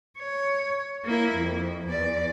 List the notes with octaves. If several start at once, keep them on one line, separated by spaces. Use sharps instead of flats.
C#5
A#3 E4
F2
E2 D5